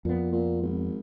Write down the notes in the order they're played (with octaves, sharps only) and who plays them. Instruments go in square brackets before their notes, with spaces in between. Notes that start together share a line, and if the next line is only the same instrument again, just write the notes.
[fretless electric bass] F2 B3 [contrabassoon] A#2
[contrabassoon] A#2
G#1